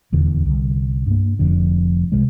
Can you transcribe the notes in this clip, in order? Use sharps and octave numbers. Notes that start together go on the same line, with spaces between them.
D#1 E2 D3
C2 D3
G2 A#3
F1 F2 D3
C2 C3 G#3